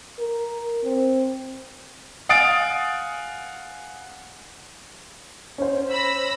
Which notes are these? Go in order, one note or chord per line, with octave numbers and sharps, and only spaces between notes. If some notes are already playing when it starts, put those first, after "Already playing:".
A#4
C4
F5 F#5 G#5 D#6 A6 D7
C#4 C5
B5 E6 A#6